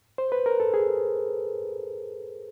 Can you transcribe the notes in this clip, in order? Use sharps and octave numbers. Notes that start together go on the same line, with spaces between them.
C5
B4
A#4
A4
G#4